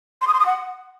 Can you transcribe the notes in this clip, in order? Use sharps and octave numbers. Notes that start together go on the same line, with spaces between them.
C6
D#6
C6
D#6
F#5